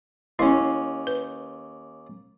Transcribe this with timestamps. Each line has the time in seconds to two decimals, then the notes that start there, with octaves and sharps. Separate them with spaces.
0.39 D#2 C#4 E4
1.07 B4